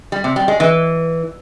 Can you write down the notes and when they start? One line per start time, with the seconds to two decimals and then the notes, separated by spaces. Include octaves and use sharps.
0.12 G3
0.24 C3
0.36 G3
0.48 G#3
0.60 E3